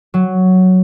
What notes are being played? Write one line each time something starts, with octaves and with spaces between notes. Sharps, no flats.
F#3